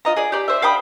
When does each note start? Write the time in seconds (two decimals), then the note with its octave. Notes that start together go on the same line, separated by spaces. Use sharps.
0.05 F4 D#5 A#5
0.16 G#4 D5
0.32 G4 D5
0.48 C5 E5
0.62 F5 G5 B5 D#6